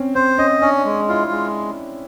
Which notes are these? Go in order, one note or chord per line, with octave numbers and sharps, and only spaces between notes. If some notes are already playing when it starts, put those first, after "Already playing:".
Already playing: C4 C#4
C4 C5
C#4 D#5
C#4 D4
G#3
E4 F4
G#3